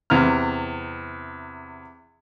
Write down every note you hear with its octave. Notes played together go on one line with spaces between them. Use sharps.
E2 C3 A#5 F6